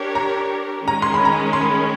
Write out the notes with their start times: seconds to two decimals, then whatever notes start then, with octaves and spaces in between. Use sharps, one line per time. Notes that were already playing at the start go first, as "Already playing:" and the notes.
Already playing: D4 G4 A#4 C#5
0.15 A#5
0.88 D#3 G#3 C#4 A#5
1.02 C6
1.14 B5
1.25 A#5
1.53 C6
1.61 B5